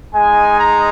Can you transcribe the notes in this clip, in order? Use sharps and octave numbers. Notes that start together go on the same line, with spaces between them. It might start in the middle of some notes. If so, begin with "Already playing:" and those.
G#3 D#4 G#5
A#5